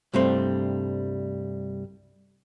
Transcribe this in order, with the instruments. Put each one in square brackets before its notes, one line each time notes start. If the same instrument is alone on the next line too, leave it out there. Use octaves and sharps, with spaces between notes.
[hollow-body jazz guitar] C2 G2 G3 A3 C4